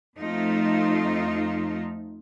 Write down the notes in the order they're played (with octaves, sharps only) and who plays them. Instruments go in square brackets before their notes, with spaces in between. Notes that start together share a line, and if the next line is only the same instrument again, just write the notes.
[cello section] F2 A3 D#4 F4